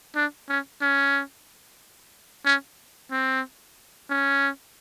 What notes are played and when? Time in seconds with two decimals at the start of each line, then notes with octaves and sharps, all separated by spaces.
0.15 D4
0.49 C#4
0.82 C#4
2.45 C#4
3.11 C4
4.10 C#4